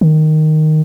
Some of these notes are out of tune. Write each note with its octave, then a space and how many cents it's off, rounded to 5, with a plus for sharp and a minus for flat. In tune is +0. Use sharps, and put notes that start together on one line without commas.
D#3 -5